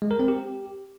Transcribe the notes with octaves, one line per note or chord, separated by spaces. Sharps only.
G#3
A#4
C4
G4